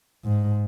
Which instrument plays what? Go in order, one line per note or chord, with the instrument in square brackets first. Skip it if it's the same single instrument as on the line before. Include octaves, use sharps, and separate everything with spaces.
[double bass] G#2